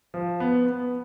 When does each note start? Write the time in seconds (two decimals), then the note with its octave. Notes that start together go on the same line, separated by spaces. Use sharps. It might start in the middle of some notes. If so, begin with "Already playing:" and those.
0.14 F3
0.40 B3
0.66 B3